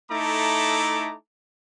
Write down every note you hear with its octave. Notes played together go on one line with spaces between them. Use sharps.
A3 D#4 E4 A4 A#5 D6